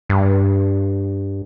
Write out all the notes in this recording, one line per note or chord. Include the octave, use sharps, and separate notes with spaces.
G2